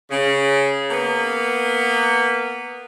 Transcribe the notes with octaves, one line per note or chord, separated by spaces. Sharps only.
C#3
A#3 B3